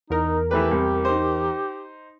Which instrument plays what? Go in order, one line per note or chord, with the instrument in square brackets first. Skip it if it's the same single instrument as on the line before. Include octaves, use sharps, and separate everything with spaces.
[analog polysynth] E2 A#4 [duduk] D#4
[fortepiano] E3 A3 B4 [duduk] G4
[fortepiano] C2
D#4 C5